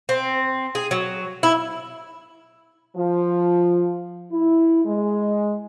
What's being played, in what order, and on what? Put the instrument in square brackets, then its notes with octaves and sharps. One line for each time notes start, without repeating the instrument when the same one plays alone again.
[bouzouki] C4
G#4
F#3
E4
[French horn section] F3
E4
G#3